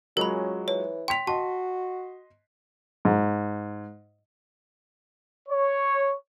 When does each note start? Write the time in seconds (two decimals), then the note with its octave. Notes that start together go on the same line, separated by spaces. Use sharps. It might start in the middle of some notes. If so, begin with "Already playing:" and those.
0.17 F#3 G#3 C#4 F4 A#4 B5
0.68 E3 C#5
1.08 G5 C6 B6 F7
1.27 F#4 D#5 A5 C6
3.05 G#2
5.49 C#5